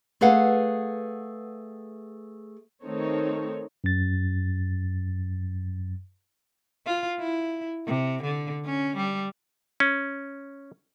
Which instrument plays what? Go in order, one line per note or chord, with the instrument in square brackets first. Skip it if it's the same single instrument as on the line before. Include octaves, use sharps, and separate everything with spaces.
[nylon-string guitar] A3 G#4 B4 F5 F#5
[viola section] D#3 A3 C4 D#4 A4 C#5
[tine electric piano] F#2 A6
[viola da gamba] F4
E4
C3
D3
C#4
G3
[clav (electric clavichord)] C#4